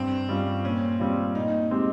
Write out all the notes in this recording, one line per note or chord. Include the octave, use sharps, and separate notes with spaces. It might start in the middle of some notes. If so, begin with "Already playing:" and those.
Already playing: G2 C4
G3 C#4 F4
A#2 C#4
G3 C4 F4
A#2 D#4
G#3 C4 G4